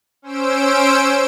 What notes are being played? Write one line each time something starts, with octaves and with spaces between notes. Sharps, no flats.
C#4 C5 E6 D7